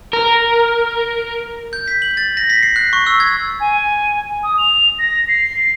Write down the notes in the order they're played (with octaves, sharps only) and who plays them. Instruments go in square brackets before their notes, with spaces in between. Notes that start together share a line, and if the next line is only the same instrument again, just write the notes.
[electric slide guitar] A#4
[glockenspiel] G6
B6
F#7
A6
A#6
B6
C7
F#6
C#6
E6
G#6
[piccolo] G#5
D#6
F7
A#6
C7